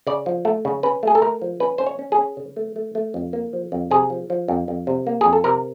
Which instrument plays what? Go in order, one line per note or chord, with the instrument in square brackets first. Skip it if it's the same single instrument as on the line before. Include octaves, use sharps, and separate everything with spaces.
[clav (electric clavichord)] C#3 D5
F3
A3
C#3
C#4 B4
A3 G#4
A4
A3 A#4
F3
C#4 B4
C#4 C5
C#5
C#4
G#4
C#4
C#3
A3
A3
A3
F2
A#3
F3
F2
C3 G#4
F3
F3
F2
F2
C3
A#3
F2 G#4
A4
C3 A#4